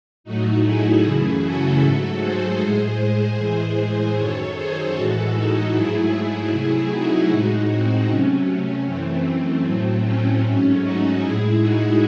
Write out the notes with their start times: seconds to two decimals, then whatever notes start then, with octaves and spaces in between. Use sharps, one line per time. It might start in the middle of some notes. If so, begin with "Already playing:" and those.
0.24 A2 F#3 A3 D#4 F#4
0.64 E4 G#4
1.03 F#2 C#3 E3 A3
1.42 F#4 A4
1.81 G#2 F#3 A3
2.21 G#4 C5
2.59 A2 G#3 G#4 C5
3.38 A2 E3 G#3
4.16 F#2 D#3 F#3 A4 C#5
4.55 G#4 C5
4.94 A2 E3 G#3 F#4 A4
5.34 D#4 F#4
5.73 G#2 F#3 A3 E4 G#4
6.51 C3 F#3 A3
6.90 D#4 F#4
7.30 A2 G#3
7.69 C4 D#4
8.08 C3 F#3 A3 C#4
8.47 C#4
8.86 F#2 E3 A3 C4
9.64 A2 F#3 A3
10.04 C#4
10.43 G#2 F#3 A3
10.82 D#4 F#4
11.21 A2 G#3 E4 G#4
11.61 D#4 F#4